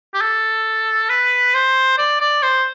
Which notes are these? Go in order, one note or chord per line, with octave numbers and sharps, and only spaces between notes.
G4
A4
B4
C5
D5
D5
C5